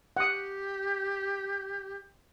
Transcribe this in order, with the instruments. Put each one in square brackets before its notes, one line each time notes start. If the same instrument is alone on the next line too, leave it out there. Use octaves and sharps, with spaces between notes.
[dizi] G4 [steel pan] F#5 D#6